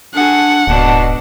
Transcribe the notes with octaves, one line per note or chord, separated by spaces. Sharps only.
D4 F#4 G#4 A4 F#5
D1 G#2 B2 D4 A5